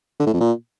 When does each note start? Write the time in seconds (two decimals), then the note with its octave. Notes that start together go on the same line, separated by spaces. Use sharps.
0.20 D3
0.27 A2
0.33 F2
0.40 A#2